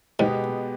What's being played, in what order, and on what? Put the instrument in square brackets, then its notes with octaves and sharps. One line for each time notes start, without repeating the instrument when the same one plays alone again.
[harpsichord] G#2 [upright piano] B2 G#3 B3 G4